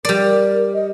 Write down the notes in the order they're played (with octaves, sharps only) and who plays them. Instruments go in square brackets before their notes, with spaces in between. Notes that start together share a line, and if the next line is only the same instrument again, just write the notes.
[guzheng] G3 D5 [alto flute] A#4
[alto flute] D#5